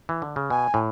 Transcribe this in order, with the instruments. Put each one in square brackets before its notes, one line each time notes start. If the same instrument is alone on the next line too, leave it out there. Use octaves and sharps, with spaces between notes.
[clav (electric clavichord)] E3
D3
C#3
[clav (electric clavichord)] B2 [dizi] G#5
[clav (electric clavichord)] A2